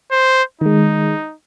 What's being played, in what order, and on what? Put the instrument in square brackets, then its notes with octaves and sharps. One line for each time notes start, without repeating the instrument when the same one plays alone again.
[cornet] C5
[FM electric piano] D#3 G#3 [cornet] D#4